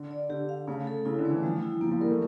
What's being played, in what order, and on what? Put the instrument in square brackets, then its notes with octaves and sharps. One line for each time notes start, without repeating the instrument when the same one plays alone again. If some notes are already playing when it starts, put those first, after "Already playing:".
Already playing: [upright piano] D3
[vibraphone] D5
[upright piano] D3 [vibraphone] G4
[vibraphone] F5
[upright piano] C#3 [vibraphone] A3
[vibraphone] A4
[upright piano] C#3 [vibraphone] E4
[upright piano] D3
[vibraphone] A3
[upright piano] E3
[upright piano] F3 [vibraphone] G3
[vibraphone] E4
[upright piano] F3 [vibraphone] A#3
[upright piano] F3
[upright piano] G3 [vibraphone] A#4
[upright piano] A3